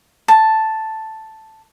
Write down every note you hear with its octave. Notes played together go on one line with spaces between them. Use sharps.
A5